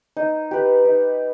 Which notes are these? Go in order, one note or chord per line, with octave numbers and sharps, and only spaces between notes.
D#4
G4 B4
D#4